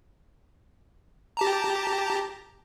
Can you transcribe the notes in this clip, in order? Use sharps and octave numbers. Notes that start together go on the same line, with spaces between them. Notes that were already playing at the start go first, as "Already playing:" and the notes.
G4 A5 A#5